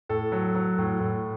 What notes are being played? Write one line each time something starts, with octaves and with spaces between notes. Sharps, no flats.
A2 A4
F#3
F#3
A2
A2